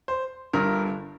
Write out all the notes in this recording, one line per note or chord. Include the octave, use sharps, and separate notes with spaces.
C5
G1 G2 D3 A#4